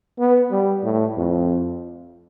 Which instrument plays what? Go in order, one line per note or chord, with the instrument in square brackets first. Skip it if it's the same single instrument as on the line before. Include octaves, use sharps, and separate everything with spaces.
[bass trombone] B3
G3
A2
F2